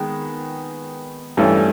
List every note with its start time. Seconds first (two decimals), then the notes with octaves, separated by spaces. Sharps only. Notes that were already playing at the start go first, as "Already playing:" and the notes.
Already playing: D#3 G#3 B3
1.37 G2 E3 A3 C#4